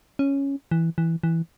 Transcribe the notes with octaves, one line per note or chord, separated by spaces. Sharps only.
C#4
E3
E3
E3